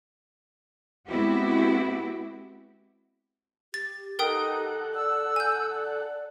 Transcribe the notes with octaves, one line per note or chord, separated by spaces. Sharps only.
G#3 B3 C4 E4 F#4 G4
G4 A6
D#4 A4 A#4 F#5 G5 D#6
D5 E6
D5 G#5 G6